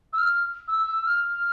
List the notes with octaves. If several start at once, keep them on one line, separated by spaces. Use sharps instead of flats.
E6
F6
E6
F6